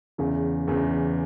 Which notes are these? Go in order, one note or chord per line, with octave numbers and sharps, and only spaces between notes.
E2 C#3 E3
E2 C#3 E3